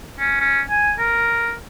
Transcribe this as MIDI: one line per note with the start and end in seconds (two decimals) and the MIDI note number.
0.19 0.37 61
0.40 0.61 61
0.70 0.93 80
0.99 1.54 70